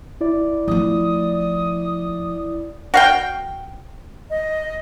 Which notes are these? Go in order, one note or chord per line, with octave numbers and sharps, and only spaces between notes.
E4 D5
F3 A3 D#6
F#4 F5 G5
D#5